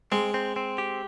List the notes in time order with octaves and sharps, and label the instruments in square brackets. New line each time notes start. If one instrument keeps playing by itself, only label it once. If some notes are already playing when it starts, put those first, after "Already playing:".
[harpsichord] G#3 [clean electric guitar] C4
[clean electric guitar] C4
C4
G4